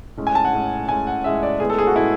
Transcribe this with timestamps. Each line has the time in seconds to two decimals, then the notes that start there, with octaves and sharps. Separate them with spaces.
0.17 A2 G#3 C#4
0.27 G#5
0.35 A5
0.45 F#5
0.53 A2 G#3 C#4
0.89 A2 G#3 C#4 G#5
1.07 F#5
1.24 A2 G#3 C#4 E5
1.43 D5
1.60 A2 G#3 B3 G#4
1.70 A4
1.79 G#4
1.87 F#4
1.96 A2 G#3 B3 E4